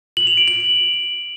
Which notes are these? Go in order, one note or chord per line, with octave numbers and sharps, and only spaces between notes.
F#7
F7
D7
F#7